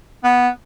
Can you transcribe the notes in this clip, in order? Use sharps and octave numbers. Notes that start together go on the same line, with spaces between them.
B3